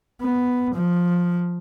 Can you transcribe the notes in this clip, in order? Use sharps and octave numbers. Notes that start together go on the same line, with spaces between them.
B3
F3